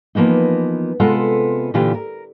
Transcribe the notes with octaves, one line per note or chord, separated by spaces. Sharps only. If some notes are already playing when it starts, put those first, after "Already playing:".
E3 F3 A#3 B3 D#4
C3 G#3 B3 F4 A4 F#5
A#2 D3 E3 F4 G4
A#4